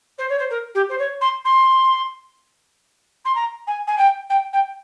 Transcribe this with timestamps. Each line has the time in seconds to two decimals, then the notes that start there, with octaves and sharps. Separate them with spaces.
0.18 C5
0.29 C#5
0.38 C5
0.50 A#4
0.74 G4
0.89 C5
0.98 C#5
1.21 C6
1.44 C6
3.25 C6
3.35 A#5
3.67 G#5
3.87 G#5
3.98 G5
4.29 G5
4.53 G5